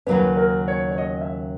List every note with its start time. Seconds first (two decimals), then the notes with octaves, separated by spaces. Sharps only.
0.06 D#2 C#3 F#3 A#3 C#4 B4
0.37 A#4
0.68 C#5
0.92 C#5
0.98 D#5
1.21 E5